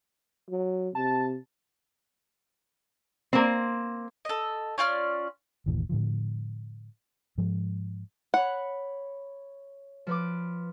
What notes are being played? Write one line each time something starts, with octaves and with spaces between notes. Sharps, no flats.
F#3
C3 A5
A#3 C4
A4 D#5
C#4 F4 D5 F6
G1 D#2 A#2 E3
A2 D3 F3
G#2 F3 G#3
C#5 F#5 B5
F3 B4 D6